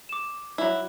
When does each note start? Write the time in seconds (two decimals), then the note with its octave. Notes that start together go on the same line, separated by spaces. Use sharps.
0.09 D6 E7
0.58 F#3 E4